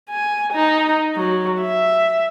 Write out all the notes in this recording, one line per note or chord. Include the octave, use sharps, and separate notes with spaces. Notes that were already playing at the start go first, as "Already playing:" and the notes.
G#5
D#4
F#3
E5